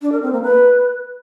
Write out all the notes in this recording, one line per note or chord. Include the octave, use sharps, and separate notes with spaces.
D4
A#4
C4
A#3
B4